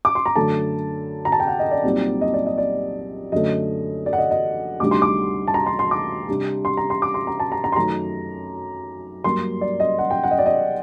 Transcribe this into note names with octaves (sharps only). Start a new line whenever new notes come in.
D6
C6
A#5
F#2 D3 A3 A5
A#5
A5
G5
F#5
D#5
D5
C2 A#2 F#3 C4 D#4
D#5
D5
D#5
D5
F#2 D3 A3 D#5
D5
F#5
D#5
D#5
D2 C3 D#3 G3 D4 D6
C6
D6
A5
A#5
C6
C6
D6
C3 G3 D4
C6
A#5
C6
D6
C6
A#5
A5
A#5
A#5
C6
F#2 D#3 A3 D#4 A#5
G2 F#3 A#3 C6
D5
D#5
F#5
G5
F#5
D#5
D5
D#5